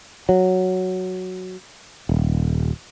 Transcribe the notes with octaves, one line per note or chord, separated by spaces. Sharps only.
F#3
D#1